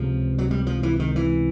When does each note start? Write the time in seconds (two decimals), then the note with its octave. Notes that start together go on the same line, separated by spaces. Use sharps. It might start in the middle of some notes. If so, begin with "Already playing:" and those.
Already playing: C#2 C3 F3
0.38 F#3
0.51 G3
0.67 F3
0.83 E3
0.99 D#3
1.16 E3